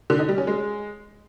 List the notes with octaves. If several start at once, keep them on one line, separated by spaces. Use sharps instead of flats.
D3
D#4
G3
C#4
G#3